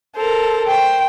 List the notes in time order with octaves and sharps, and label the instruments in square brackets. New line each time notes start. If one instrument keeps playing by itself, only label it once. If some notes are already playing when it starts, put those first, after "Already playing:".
[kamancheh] A4 [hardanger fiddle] A#4 C5
[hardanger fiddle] C5 [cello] G5